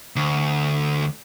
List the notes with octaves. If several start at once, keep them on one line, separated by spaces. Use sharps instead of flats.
D2